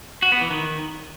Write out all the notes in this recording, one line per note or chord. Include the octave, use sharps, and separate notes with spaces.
F#4
B3
E3
D#3